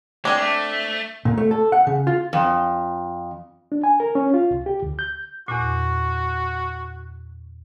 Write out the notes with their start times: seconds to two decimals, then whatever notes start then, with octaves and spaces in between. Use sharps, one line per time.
0.25 G#3 C4 D4
0.40 A3
1.25 A#2
1.38 A3
1.51 A4
1.72 F#5
1.87 C#3
2.07 F4
2.33 F2
3.72 D4
3.84 G#5
4.00 A#4
4.15 C#4
4.34 F4
4.51 C2
4.66 G4
4.82 D2
4.99 G6
5.48 E2 A#2 F#4